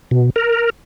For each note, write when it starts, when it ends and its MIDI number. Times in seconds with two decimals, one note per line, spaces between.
0.11 0.30 47
0.36 0.70 70